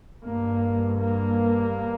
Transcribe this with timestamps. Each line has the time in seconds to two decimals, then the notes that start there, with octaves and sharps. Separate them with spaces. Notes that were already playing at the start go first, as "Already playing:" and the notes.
0.23 G2 A#3
0.98 A#3